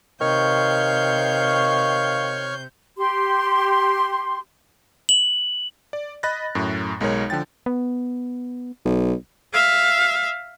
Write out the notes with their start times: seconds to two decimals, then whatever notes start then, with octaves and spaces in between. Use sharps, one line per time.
0.21 C3 D#3 C#5 F5 C#6 F6 G6
2.97 G4 C6
5.09 F#7
5.93 D5
6.23 D#5 B5 F#6 A6 A#6
6.55 F#2 A2
7.01 B1 G#3 D#4 A#4 C#5
7.30 D3 F3 G5 A6
7.66 B3
8.85 B1
9.53 E5 F5